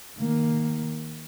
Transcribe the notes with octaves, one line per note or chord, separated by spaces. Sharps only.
D#3 A#3